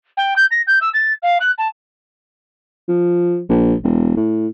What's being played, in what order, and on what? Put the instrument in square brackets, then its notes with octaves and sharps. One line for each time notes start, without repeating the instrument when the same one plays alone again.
[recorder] G5
G6
A#6
G6
E6
A6
F5
F#6
A5
[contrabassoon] F3
A#1
E1
A2